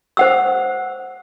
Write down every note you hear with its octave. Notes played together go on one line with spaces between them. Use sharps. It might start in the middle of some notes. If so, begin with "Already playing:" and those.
C5 F#5 E6